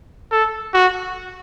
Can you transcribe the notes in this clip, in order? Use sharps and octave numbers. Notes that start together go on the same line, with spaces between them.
A4
F#4